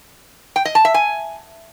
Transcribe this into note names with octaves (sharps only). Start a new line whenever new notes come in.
G5
D#5
A5
E5
G#5